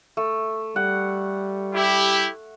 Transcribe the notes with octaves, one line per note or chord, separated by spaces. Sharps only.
A3
G3 F#5
E4 G4